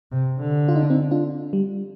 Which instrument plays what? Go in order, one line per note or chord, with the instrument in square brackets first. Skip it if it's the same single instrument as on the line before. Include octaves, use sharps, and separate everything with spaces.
[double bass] C3
D3
[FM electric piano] F4
D#4
D4
C4 D#4
D4 F4
G3